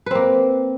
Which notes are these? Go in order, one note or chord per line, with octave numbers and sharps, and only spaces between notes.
A#3 C4 B4